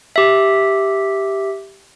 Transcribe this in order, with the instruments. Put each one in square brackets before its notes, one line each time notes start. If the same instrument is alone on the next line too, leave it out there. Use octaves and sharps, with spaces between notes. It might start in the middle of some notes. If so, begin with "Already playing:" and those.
[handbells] G4 E5